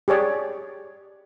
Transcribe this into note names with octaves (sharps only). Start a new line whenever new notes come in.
G4 G#4 C#5 D5